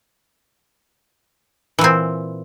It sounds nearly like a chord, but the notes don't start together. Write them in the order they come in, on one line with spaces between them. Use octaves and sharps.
E3 A#2 C4